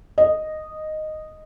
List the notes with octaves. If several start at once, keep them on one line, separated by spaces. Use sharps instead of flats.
D#5